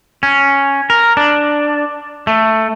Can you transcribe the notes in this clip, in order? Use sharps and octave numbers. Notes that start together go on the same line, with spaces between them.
C#4
A#4
D4
A3